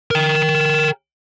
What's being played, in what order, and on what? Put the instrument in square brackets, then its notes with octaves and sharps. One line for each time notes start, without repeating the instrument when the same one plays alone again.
[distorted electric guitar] A#4 G5